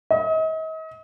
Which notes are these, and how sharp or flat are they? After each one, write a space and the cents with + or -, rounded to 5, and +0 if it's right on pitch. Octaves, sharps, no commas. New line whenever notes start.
D#5 +40